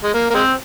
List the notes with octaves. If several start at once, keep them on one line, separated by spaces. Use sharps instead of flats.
G#3
A#3
A#3
G#3 C4